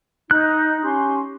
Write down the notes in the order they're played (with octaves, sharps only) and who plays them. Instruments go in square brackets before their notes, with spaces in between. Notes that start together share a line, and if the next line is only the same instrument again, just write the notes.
[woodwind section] D#4 [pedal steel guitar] F#6
[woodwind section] C#4 G4 C6